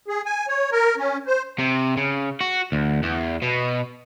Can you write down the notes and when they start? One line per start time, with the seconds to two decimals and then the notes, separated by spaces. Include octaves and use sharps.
0.08 G#4
0.25 G#5
0.48 C#5
0.72 A#4
0.97 C#4
1.27 C5
1.59 C3
1.97 C#3
2.41 F#4
2.72 D2
3.03 E2
3.42 B2